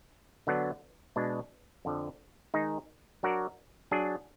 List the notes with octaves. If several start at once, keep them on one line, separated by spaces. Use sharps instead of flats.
D3 F#3 B3 D4
B2 G#3 D4
F2 D3 F3
D#3 G#3 D#4 G#4
F#3 D4 F#4 A#4 D5
F#3 D4 G#4